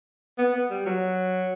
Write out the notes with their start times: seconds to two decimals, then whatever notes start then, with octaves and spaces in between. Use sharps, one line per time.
0.38 B3
0.54 B3
0.70 G3
0.86 F#3